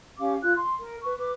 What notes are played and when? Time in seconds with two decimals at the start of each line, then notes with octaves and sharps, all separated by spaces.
0.18 C#4 G4 F5 D6
0.42 F4 F#6
0.55 C6
0.80 A#4
1.03 B4 C#6
1.17 B4 D6